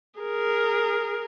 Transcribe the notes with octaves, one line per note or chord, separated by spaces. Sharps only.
G#4 A#4